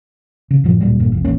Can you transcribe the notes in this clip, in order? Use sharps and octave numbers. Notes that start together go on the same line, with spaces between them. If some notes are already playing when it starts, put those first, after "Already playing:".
C#3
F#2 A2 F3
D1 A#2 F#3 G3
E1 G2 A#2 A#3
C2 F2
E1 A1 A#3 C#4